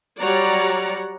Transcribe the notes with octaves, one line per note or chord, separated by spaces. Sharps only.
F#3 G3 C#5 D5 F#5 A#5